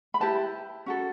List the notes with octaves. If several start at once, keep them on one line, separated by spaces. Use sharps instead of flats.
B5
E4 G4 B4 A5
C#4 F#4 A4